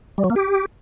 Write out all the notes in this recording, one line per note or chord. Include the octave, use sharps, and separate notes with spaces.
G3
F#3
A#3
G4